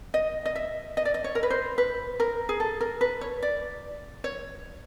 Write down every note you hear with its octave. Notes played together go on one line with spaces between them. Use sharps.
D#5
D#5
E5
D#5
D5
D#5
C#5
A#4
B4
C5
B4
A#4
G#4
A4
A#4
B4
C#5
D5
C#5